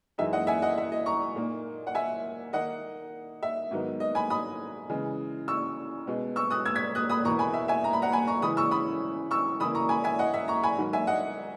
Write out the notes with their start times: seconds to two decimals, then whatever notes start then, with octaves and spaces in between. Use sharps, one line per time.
0.18 F#2 E3 G#3 D#4 E5
0.33 D#5 F#5
0.47 E5 G#5
0.62 D#5 F#5
0.78 E5
0.92 D#5
1.06 A#5 C#6
1.35 A#2 A#3 D#4
1.87 F#5
1.95 E5 G#5
2.53 D#3 A#3 D#4 D#5 F#5
3.43 E5
3.71 G#2 D#3 F#3 B3 D#4
4.00 D#5
4.15 G#5 B5
4.30 B5 D#6
4.90 C#3 E3 G#3
5.48 C#6 E6
6.07 B2 G#3 B3
6.36 C#6 E6
6.50 D#6 F#6
6.65 E6 G#6
6.76 G#6 B6
6.95 D#6 F#6
7.10 B5 D#6
7.24 E2 B2 A#3 E4 A#5 C#6
7.39 G#5 B5
7.54 E5
7.68 E5 G#5
7.84 A#5
7.93 B5
8.02 F#5 A#5
8.12 G#5 B5
8.27 A#5 C#6
8.42 C#3 E3 G#3 C#4 E4 B5 D#6
8.57 C#6 E6
8.71 B5 D#6
9.31 C#6 E6
9.60 C#3 E3 A#3 E4 B5 D#6
9.75 A#5 C#6
9.89 G#5 B5
10.04 E5 G#5
10.19 D#5 F#5
10.34 E5
10.48 A#5 C#6
10.63 G#5 B5
10.78 G#2 D#3 F#3
10.93 E5 G#5
11.07 D#5 F#5